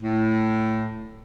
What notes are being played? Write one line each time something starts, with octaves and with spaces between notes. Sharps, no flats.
A2